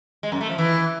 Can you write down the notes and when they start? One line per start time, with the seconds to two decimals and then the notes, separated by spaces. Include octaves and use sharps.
0.23 G#3
0.32 F#2
0.41 A3
0.49 F3
0.58 E3